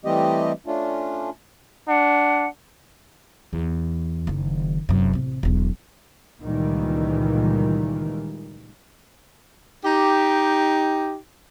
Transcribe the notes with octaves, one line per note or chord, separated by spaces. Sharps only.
E3 G3 A3 C4 G4 D#5
A3 C#4 D4 F4
D4 F#5
E2
F#1 D#3
F1 F#2
A1 C3
E1 B1
C#2 A#2 D#3 E3 G3
D#4 G4